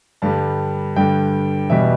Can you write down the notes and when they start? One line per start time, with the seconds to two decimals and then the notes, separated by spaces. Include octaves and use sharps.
0.22 G2 D3 G3 A5
0.96 G2 D3 G3 G5
1.70 E2 B2 G3 E5